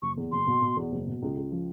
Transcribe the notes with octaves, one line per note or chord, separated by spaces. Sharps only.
F#1 C#6
E2
F#1 C6
B2
B2
E2
F#1
B2
C#2
C#2
F3